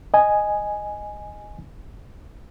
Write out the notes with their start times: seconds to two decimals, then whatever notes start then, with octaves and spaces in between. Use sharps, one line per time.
0.14 D#5 G#5